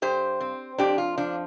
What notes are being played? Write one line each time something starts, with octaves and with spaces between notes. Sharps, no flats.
G2 G4 C5
C4
F2 D4 G4
F4
F3 D4